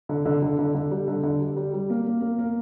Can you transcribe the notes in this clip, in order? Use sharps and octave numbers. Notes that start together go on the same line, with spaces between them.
D3
D3
D3
D3
D3
G3
D3
D3
G3
G3
G3
A#3
A#3
A#3
A#3